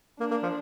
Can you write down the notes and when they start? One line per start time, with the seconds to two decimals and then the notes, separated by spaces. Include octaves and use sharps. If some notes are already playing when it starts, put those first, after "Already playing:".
0.20 A#3 D4
0.31 A#3
0.43 F3